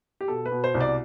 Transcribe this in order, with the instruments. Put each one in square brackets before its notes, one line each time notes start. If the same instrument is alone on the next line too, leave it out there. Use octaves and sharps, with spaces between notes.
[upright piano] G4
B2 A4
B4
B2
C5
C2
D5